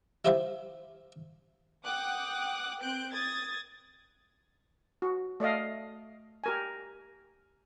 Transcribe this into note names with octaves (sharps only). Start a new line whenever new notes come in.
E4 F4 G4 C5 E5 F5
F#5 G5 D6 D#6 F#6
C4 F#6 G6 D7
D#6 G#6 A6
F#4
A3 D5 D#5 F5
G4 A#4 G#5